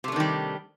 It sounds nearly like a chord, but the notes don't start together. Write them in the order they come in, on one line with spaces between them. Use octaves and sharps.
C3 A3 D4 D#3 G3